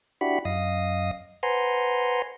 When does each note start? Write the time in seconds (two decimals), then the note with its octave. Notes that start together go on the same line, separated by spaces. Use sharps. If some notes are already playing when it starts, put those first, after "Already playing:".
0.21 D4 E4 F#4 G4 F#5 B5
0.45 F#2 D#5 F5 D#6
1.43 B4 C5 F#5 G#5 A#5 C6